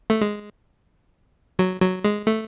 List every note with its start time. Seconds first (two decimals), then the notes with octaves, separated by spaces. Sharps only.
0.10 A3
0.21 G#3
1.59 F#3
1.81 F#3
2.04 G#3
2.27 A3